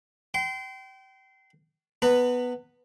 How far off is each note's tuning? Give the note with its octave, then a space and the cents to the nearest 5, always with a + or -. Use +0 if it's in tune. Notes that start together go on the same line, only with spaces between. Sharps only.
G5 -30 C6 -25
B3 +0 B4 +0 A#5 -45